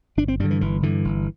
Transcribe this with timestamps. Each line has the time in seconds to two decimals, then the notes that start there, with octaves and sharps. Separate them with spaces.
0.17 G1 D4
0.28 C4
0.40 G2 G3
0.44 D3
0.51 E3
0.61 G1 E3
0.83 G2 D3 E3
1.05 G1